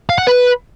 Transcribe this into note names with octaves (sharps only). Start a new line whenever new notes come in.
F5
F#5
B4